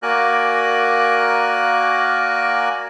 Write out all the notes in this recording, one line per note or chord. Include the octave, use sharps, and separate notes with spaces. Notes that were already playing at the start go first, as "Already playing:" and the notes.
A#3 F#4 A#4 D5 G#5 F#6